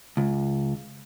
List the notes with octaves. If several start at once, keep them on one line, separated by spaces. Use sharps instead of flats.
C#2